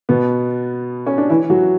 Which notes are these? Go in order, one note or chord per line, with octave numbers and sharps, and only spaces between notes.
B2 B3
C#4
D4
E3 E4
F#3 F#4